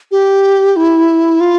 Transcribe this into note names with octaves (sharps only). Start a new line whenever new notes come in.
G4
E4
F4